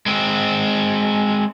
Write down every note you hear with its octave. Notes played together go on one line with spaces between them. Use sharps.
G#3 C4